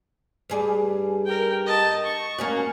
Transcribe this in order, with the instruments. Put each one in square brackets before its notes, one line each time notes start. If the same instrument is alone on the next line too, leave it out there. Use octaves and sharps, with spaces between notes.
[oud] G2 G#4 D5
[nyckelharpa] A#4 G5
D#5 A5
C#6
[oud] A#3 C#4 F#4